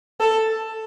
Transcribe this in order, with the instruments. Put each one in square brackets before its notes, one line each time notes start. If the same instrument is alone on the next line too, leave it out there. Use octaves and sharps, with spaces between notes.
[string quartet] A4